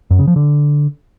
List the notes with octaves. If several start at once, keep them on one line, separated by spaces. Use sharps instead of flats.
F#2
C#3
F3
D3